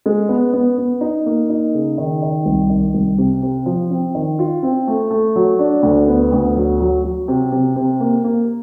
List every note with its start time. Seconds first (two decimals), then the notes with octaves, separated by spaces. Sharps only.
0.06 G#3
0.29 B3
0.53 B3
0.78 B3
1.01 D#4
1.26 A#3
1.49 D#4
1.74 C#3
1.98 D#3
2.22 D#3
2.46 C2
2.70 D#3
2.94 C2
3.18 C3
3.43 C3
3.66 F3
3.90 C4
4.15 D#3
4.39 F4
4.63 C4
4.87 A3
5.11 A3
5.36 F#3
5.59 D4
5.83 D2
6.07 B3
6.32 D2
6.56 F#3
6.80 F#3
7.03 F#3
7.28 C3
7.52 C3
7.76 C3
8.00 A#3
8.24 A#3